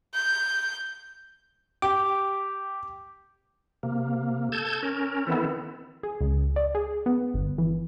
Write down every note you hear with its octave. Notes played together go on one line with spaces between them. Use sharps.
G6
G4 D6
C3 A#3
A4 A5 G6 G#6
C#4 A#4
D#3 E3 B3 C4 E4 A4
G#4
C#2
D5
G#4
B3
G1
E3